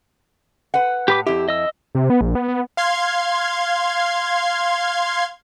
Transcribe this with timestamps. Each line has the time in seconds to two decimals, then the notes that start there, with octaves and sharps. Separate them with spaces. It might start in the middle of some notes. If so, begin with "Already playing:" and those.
0.74 B4 F#5
1.08 A2 G4 B4 D6
1.27 F2 E4 G4
1.48 D#5 E6
1.95 C3
2.10 B3
2.21 A#1
2.35 B3
2.48 B3
2.77 F5 C6 G#6